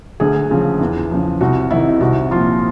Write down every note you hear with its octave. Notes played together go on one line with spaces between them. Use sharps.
D2 G#4
C#3 F3
E2
C#3 F3
C2 F#4
C3 D#3 E4
C2 F#4
A#2 F3 F4